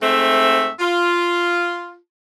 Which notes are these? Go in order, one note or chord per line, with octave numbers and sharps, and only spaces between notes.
G#2 A3 C4 E5
F4